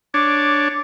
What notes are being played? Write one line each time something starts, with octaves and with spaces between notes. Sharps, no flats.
D4 C#5 D6